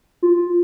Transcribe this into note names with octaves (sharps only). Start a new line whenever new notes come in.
F4